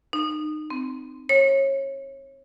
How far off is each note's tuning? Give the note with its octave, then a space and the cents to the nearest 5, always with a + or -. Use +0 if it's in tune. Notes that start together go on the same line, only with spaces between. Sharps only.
D#4 -25
C4 -15
C#5 -25